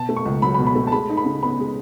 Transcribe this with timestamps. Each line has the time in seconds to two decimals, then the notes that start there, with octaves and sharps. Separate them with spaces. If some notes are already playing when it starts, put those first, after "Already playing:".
Already playing: B2 A5
0.09 A3
0.16 C#6
0.26 C#2
0.42 F#3 B5
0.54 B5
0.58 B2
0.67 B5
0.75 A3
0.87 A5
0.92 G#3 B5
1.09 D#4
1.17 B5
1.25 C#3
1.42 B3 B5
1.60 G#3